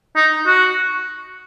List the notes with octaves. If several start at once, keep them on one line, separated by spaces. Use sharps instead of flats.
D#4
F#4